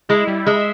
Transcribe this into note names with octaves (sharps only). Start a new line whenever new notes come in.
G#3 E4
G3
G#3 E5